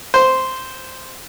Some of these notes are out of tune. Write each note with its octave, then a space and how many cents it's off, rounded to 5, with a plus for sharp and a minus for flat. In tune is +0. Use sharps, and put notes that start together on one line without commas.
C5 -5